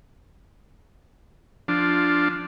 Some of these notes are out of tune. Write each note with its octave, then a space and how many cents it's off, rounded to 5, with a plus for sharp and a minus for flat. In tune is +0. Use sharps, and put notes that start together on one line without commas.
F3 +10 D4 +0 F4 +0